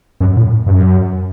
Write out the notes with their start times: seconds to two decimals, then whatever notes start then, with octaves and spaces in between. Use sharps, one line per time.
0.20 F#2
0.37 A2
0.66 G2
0.71 F#2